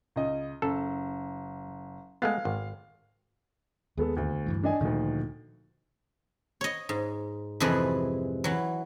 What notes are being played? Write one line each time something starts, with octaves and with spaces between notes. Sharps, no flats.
C#2 D#5
F#1 A4
G#3 A3 B3 F5
G#1
D#2 G#3 B3 A4
D2
G2 E3 A3
D4 D#5 G#5
D2 A#2 D3 D#3 F3
C#5 D#5
G#2
F2 C3 E3 G#3 G#4 B4
E3 F#3